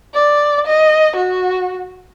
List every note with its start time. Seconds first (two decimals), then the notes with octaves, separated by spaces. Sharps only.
0.14 D5
0.67 D#5
1.16 F#4